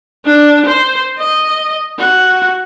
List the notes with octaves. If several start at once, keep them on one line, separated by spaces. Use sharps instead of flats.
D4
C5
D#5
F#4